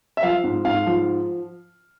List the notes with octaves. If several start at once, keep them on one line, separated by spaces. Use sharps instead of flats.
E5
F3 F5
G#2
G#2 F5
F3